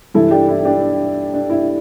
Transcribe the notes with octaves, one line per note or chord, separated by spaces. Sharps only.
G2 E3 E4 A4
D4 G4
E4
D4 G4
D4
E4